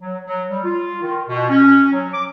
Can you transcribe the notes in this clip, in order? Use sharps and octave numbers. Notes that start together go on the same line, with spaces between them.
F#3
F#3
G3
F4
D#3
B2
C#4
F#3
D6